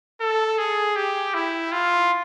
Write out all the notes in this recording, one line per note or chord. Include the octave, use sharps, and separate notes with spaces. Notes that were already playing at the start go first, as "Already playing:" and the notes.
A4
G#4
G4
E4
F4